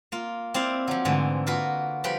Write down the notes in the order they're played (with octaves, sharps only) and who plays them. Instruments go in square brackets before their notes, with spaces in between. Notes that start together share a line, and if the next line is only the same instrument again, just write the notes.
[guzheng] A#3 F4
C4 E4 D5 F5
F3 F#3
G#2 D3 E3 A3
A#3 F4 F#4 B4
F3 G3 B4 G5